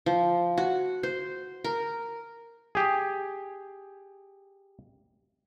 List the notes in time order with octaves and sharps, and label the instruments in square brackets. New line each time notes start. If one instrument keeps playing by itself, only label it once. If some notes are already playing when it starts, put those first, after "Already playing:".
[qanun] F3
F#4
C5
A#4
[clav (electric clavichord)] G4 G#4